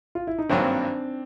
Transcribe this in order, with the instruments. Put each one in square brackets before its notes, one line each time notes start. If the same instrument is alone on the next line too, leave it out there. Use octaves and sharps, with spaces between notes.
[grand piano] F4
E4
D#4
[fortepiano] G#1 G2 D#3 F#3 A#3 [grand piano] C4 D4